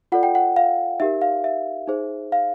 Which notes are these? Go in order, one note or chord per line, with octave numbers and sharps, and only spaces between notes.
F4 A4 D5 F#5
G5
F#5
F5
D#4 G4 A#4 E5
F5
E5
D#4 G#4 C5
F5